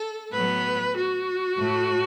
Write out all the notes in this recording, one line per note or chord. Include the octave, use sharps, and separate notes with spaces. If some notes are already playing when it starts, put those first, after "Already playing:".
Already playing: A4
A2 F#3 B3 B4
F#4
A2 A3